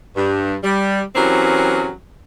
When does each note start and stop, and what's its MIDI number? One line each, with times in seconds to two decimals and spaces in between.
0.16 0.55 43
0.64 1.02 55
1.15 1.90 52
1.15 1.90 54
1.15 1.90 60
1.15 1.90 61
1.15 1.90 67
1.15 1.90 70